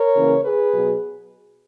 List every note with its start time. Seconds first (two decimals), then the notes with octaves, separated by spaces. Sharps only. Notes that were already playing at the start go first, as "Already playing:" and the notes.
Already playing: A#4 C#5
0.16 C#3 E3 A#3 C#4
0.44 G#4 B4
0.74 B2 F#3 B3